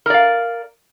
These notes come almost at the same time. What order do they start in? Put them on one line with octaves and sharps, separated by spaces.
A#4 D5 F5